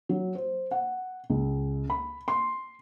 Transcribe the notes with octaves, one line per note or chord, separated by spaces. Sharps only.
F#3
C5
F#5
C#2
B5
C6